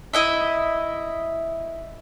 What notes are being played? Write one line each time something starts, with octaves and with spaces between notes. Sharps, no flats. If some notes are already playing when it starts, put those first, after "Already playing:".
E4 D#5 E5